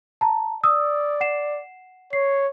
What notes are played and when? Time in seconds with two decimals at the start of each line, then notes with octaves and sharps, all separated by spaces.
0.21 A5 A#5
0.64 D5 D#6 E6
1.21 F#5 C7 E7
2.13 C#5 C7